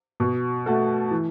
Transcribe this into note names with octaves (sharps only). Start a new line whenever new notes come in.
B2
A3 F#4 A4
E3